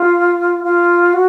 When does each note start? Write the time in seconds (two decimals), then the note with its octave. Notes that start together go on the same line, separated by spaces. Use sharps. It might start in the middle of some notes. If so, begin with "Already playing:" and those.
Already playing: F4
0.64 F4
1.13 F#4